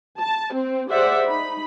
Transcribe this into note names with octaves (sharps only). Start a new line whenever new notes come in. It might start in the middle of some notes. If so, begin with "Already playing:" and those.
A5
C4
G4 G#4 C5 D5 E5 F#5
D#4 B5